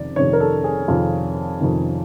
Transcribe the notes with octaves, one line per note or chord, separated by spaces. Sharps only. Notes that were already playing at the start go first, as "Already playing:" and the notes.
Already playing: F2 C3 D#3 D5
F2 C3 D#3 C#5
A#4
A4
G#4
F2 C3 D#3 F4
F2 C3 D#3